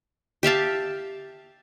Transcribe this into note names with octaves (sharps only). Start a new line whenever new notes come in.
G4 E5 F5 A5